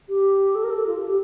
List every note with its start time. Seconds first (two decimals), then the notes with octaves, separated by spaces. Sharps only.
0.08 G4
0.55 A4
0.64 A#4
0.70 A4
0.86 F4
0.96 G4
1.06 G4